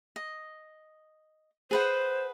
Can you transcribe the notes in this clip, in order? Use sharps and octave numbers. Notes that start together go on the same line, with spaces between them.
D#5
G#4 B4 C5 F#5